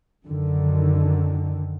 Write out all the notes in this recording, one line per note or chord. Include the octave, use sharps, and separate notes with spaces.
F#2 D3 D#3